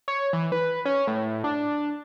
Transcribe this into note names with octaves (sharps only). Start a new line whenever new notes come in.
C#5
E3
B4
C#4
A2
D4